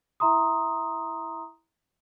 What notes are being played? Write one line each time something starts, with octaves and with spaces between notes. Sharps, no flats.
E4 E5 A#5 C6 D#6